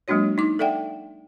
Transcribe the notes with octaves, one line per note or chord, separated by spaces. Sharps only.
F#3 G#3 A#3 D4 F#4 C#5
D#4 D6
A4 D5 E5 F#5 G5